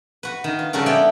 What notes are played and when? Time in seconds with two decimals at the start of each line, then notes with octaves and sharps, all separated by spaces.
0.23 F#4 B4
0.44 D#3
0.59 F4
0.73 C#3 G3 F#4 A4 A#4
0.86 B3 E4 D5 G5